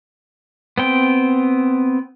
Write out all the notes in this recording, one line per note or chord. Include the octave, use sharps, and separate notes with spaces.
B3 C4 G5